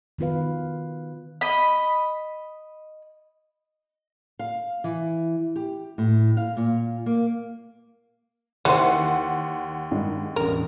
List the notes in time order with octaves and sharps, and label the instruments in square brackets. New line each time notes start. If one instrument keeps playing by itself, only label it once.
[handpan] D#3 B3 F4 B4 F5
[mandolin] D#5 B5
[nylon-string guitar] F5
E3
G4
A2
F5
A#2
A#3
[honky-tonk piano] D#2 F#5 C6 [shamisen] E3 C#4 C5
[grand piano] G2 D#3 G#3
[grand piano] E1 A1 [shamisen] A#4